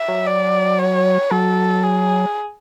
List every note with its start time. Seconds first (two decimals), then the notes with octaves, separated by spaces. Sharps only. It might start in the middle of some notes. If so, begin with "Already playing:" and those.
Already playing: E5
0.08 F#3
0.26 D5
0.79 C#5
1.31 F#3 A4
1.83 G#4